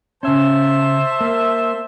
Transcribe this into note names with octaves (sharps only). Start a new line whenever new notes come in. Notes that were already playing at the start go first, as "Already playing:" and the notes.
C#3 C#4 C5 E5 A5
A#3